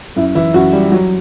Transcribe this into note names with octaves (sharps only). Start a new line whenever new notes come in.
F#2 E4
E3 E4
F#2 F#4
G3
F#3